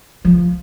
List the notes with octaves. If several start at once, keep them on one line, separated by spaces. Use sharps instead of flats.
F3